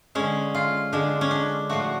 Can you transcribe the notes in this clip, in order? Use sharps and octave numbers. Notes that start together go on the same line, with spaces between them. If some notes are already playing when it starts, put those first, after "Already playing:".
D3 G#3 C#4
F4
D3 G#3 D4
C#4
D4
A2 F3 A3 F#4